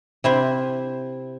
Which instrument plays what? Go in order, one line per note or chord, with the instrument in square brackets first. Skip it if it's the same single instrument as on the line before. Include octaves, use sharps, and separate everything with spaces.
[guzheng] C3 E4 C5